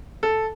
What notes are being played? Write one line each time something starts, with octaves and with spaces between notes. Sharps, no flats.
A4